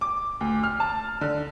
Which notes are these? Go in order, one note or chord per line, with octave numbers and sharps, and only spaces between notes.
D6
D2
F6
A5
D3